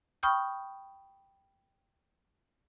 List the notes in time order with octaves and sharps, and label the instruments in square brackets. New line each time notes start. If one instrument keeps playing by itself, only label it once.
[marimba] G5 B5 C#6 D#6 F6 G6